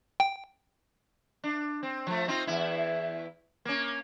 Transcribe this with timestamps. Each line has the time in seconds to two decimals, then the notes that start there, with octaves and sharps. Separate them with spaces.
0.20 G5
1.44 D4
1.83 C4
2.07 F3 A3
2.28 C4 D#4 F4
2.47 E2 E4
3.65 A#3 C#4